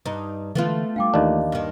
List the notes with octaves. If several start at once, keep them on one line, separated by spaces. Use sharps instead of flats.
G2 D#4
D3 E3 G#3 A3 B3 F4
G3 D4 F5 G5 D6
D#2 E3 D4 D#5 F5
G2 D#3